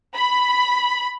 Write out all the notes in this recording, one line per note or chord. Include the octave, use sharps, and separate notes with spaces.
B5